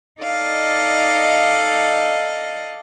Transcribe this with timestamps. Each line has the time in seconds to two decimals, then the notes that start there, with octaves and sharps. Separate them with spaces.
0.22 D#4 A4 D5 D#5 F5